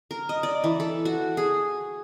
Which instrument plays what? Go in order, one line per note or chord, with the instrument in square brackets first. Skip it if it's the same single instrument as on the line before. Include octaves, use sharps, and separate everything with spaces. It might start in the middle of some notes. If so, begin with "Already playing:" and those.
[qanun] A#4
D#5
D5
E3
A4
F#4
G#4